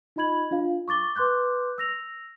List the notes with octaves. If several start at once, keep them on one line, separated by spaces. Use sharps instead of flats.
D#4 F4 D#5 B5 G#6 F#7
D4 F4 F5
C#6 D6 A6 G7
B4 C6 D6 F#6 G6
E6 A#6 F7